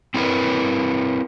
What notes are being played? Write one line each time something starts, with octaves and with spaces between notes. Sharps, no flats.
C4 E4 G#4 A#4 B4